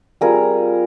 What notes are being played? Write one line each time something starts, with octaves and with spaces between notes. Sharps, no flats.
G3 C4 F4 G#4 A#4